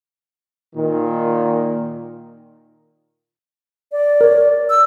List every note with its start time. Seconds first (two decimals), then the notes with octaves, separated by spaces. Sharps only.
0.76 A#2 D#3
3.92 D5
4.21 A#4 C#5
4.70 E6